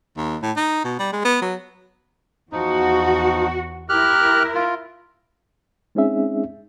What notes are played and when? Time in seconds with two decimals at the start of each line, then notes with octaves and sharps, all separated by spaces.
0.17 D#2
0.42 A2
0.57 D#4
0.84 B2
0.99 G3
1.13 G#3
1.25 B3
1.42 F#3
2.52 E2 F3 D#4 F#4
3.89 E4 G4 A#4 F6 F#6
4.55 F4
5.95 G#3 C4 C#4 D#4 G#4 E5